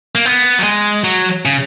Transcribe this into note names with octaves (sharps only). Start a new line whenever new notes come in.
A#3
B3
F#3
G#3
F#3
C#3